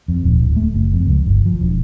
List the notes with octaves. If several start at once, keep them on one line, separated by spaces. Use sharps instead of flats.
F2
D#1
D1
A3
F#1
F2
C#2
G1
F3
E1